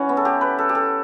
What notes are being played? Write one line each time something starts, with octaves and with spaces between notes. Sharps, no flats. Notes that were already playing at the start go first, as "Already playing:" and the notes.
Already playing: E3 C#4 F#4
B3
A4
G4
B4
A4
G4
A4